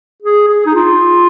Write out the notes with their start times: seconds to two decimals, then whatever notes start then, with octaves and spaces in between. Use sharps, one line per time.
0.22 G#4
0.48 G#4
0.66 D#4
0.75 F4